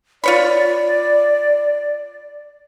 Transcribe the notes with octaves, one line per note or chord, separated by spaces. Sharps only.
F4 C#5 D5 B5